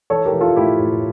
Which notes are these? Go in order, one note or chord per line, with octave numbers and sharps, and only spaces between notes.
E3 A4 C#5
G4 A#4
E3
F4 A4
A2 E4 G4
A2